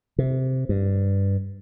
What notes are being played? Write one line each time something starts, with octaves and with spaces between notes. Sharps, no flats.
C3
G2